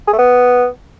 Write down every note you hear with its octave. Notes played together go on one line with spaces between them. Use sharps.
G#4
A3
B3